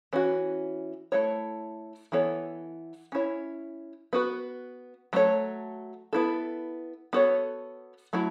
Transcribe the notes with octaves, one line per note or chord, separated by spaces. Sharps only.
E3 C#4 F#4
A3 E4 A4 C#5
E3 B3 A4 C#5
C#4 E4 C#5
B3 F#4 B4
F#3 A3 E4 A4 C#5
B3 E4 A4
B3 F#4 A4 C#5
F#3 A3 E4